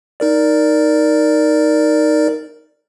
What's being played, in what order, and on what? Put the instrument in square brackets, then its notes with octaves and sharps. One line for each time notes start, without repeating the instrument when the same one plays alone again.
[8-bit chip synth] D#4 A#4 D5